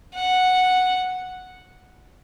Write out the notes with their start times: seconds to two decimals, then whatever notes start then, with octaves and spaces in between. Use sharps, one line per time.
0.15 F#5